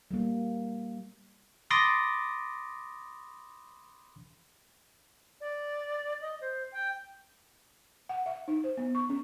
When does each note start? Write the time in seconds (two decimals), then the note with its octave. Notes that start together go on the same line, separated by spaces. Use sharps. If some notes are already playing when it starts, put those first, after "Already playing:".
0.11 G3 A#3
1.70 B5 C6 D6 D#6 A6 A#6
5.41 D5
6.21 D#5
6.41 C5
6.72 G5
8.09 F#5
8.26 E5
8.48 D#4
8.64 C5
8.77 B3
8.95 C#6
9.09 C#4